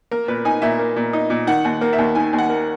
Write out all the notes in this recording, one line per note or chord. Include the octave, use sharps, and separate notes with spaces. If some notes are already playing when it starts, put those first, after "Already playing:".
A#3 A#4
A#2 B4
D#4 G#5
A#2 E5
A#3
A#2
D#4
A#2
D#3 F#5
D#2
A#3
E5
D#2
D#3 G#5
D#2
F#5
A#3